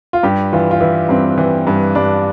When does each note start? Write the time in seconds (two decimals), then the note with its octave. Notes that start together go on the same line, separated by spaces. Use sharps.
0.13 F4
0.23 G2 G4
0.53 E3 F4
0.71 F4
0.80 E3 E4
1.09 G2 C4
1.37 E3
1.67 G2
1.95 G2 D4